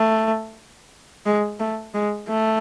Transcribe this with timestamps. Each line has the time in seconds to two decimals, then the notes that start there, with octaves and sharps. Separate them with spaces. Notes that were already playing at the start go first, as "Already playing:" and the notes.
Already playing: A3
1.26 G#3
1.59 A3
1.94 G#3
2.28 A3